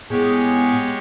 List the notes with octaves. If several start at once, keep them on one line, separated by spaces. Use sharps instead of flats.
A2 G#3 B3 G4 G#4 C#5